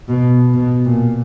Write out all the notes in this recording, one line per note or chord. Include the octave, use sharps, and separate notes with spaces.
B2
B2
A#2